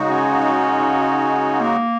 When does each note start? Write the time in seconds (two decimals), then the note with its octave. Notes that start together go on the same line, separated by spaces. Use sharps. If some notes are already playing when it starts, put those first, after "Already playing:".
Already playing: C#3 G#3 D#4 F#4
0.09 C#4
1.61 A#3